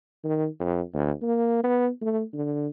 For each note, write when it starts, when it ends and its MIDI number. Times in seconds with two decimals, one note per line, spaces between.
0.24 0.46 51
0.60 0.81 41
0.94 1.11 38
1.22 1.64 58
1.64 1.90 59
2.01 2.23 57
2.34 2.67 50